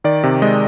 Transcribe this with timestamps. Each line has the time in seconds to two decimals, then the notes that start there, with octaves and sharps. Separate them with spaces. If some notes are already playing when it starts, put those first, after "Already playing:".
0.04 D#3 D5
0.23 C3
0.42 G#3 D#5